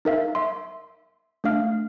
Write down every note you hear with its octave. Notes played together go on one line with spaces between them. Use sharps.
D#4 A#4 E5 F5
E5 C6
A3 D4 F5 F6